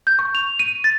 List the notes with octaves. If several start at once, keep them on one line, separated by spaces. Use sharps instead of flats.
G6
C#6
F7
D#7
A6